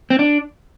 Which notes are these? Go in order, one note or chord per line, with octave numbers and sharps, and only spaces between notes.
C4
D4